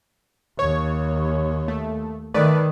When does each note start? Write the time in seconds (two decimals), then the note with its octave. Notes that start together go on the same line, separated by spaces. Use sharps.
0.59 D#2 C#5
1.68 A3
2.34 D#3 A3 B4 D5